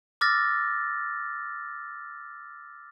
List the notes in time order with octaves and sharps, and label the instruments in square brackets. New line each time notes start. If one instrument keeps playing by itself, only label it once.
[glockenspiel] D6 E6 F6 A6 A#6